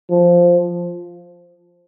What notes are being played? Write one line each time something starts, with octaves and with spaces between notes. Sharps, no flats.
F3